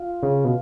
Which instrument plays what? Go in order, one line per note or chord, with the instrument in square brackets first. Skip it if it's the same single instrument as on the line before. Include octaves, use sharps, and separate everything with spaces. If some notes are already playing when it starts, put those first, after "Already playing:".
Already playing: [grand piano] F4
[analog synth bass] C#3
B2